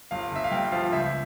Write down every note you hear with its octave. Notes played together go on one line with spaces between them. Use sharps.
G1 F5
G1 E5
F5
G2 G5
F3 F5
C#2 E5